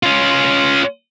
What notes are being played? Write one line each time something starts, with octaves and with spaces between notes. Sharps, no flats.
C#4 F4